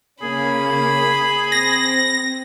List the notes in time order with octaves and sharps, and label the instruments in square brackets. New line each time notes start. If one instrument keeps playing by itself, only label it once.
[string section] C#3 A#3 C#4 [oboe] G#4 [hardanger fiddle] B5
[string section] C4 [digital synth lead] A#6